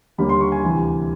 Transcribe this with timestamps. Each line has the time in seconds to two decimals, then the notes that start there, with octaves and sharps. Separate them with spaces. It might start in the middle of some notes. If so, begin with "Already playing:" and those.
0.18 D#2 D3 G3 A#3 B5
0.29 C6
0.41 C#6
0.52 G#5
0.63 D2 C3 E3